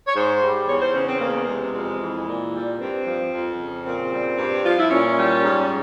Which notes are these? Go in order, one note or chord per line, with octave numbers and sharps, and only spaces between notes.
C#5
G#2 C5
G3
E2 C#5
C5
C#3 C#4
C4
E2 A#3
C3 G#3
F2
E3
A#2
G3
G2 C4
F3
F2
C#3
A#2 C4
G3
G2
F3 F4
E4
A#2 C#4
G3
G#2